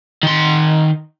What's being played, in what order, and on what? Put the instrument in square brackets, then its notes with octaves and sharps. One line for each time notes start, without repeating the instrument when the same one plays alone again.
[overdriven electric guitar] D#3 C6